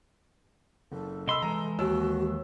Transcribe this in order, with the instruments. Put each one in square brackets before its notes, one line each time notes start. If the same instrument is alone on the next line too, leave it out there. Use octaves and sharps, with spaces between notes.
[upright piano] F#1 [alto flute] A4
[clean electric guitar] C2 C6 [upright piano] D#5 B5 E6
[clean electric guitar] E3 G#3 [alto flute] A4 [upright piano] A#5
[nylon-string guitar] D#2 [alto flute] F#4 [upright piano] E6